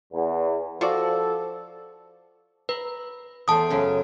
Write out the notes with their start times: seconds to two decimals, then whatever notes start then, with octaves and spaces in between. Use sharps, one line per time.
0.13 E2
0.81 F3 F4 F#4 A4 D5
2.69 B4 A#5 B5
3.48 E2 A3 C5 A5 D#6
3.70 F#2 C#3